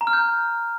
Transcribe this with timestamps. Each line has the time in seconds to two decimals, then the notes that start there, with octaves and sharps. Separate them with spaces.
0.01 A#5
0.07 F6
0.13 G6